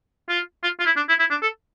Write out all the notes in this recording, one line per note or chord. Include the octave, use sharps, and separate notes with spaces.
F4
F4
F4
E4
D4
E4
E4
D4
A4